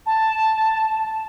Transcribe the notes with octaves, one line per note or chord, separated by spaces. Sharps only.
A5